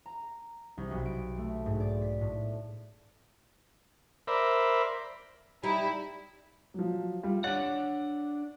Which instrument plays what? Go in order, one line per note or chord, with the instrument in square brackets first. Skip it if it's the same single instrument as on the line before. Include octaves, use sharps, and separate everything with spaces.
[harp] A#5
C2
B1
D7
A3
G#2
D5
B6
A2
[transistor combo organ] A#4 C5 D5 E5 B5
[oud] G3 D#4 [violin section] E4
[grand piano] F3 F#3
G3 F4
[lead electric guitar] D4 F#5 [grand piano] C#5 A6